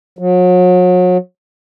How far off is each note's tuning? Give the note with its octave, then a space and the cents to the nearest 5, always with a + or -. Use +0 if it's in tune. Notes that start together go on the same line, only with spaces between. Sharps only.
F#3 -35